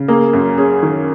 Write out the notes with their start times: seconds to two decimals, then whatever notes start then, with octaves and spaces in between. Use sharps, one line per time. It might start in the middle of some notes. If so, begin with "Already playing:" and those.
Already playing: C#3
0.08 A#3 G#4
0.33 F#2
0.58 C#4 G#4
0.83 D#3